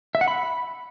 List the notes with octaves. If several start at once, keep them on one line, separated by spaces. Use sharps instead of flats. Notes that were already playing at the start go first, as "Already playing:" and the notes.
E5
F#5
B5